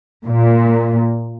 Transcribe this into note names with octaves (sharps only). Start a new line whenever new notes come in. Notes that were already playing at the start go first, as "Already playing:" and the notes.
A#2